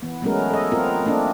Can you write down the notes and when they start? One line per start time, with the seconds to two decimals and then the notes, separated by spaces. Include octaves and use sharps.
0.02 E3 B3
0.22 F#3 G#3 A3 B3 C#4 A#4
0.51 A4 D#5
0.72 B3 C4 F4 A#4
1.04 A3 A#3 C4 D4 D#5